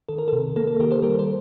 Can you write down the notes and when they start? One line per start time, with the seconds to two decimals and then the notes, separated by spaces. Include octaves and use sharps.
0.09 D#3 A4
0.18 A#4
0.28 A4
0.33 C3
0.56 A#3 A4
0.67 A4
0.80 D#3 G4 A#4
0.91 A4 C5
1.02 G3 G4 A#4
1.19 A4 C5